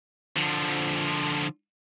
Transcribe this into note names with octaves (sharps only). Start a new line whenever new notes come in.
D3 F3